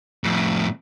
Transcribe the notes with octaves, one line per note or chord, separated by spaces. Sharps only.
F2 A2